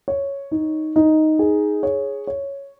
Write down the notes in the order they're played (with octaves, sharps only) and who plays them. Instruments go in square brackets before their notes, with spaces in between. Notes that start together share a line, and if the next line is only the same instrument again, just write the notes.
[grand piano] C#5
D#4
D#4
G#4
C#5
C#5